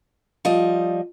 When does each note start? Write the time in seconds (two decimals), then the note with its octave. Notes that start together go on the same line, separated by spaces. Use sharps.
0.45 F3 G3 D#5